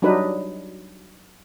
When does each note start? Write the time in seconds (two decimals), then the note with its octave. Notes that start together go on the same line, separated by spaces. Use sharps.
0.02 F#3 G3 D4 D#4 B4